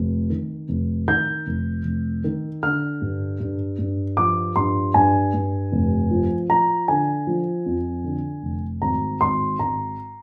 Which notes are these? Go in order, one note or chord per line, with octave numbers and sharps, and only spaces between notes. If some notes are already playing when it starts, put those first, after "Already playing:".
Already playing: F1
D#3
F1
D#3 G6
F1
F1
D#3
D3 F6
G2
G2
G2
F3 D6
G2 C6
G2 G#5
G2
F1
F3
F3 A#5
D3 G#5
F3
F2
D3
F1
G#1 A#5
G#1 C6
G#1 A#5